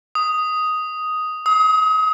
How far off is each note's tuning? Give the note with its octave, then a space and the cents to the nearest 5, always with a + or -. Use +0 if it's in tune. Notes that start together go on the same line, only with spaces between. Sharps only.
D#6 +5
D#6 +35